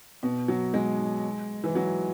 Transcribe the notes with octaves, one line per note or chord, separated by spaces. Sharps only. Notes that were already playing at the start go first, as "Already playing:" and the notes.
B2
F#3
G#3
E3
F#3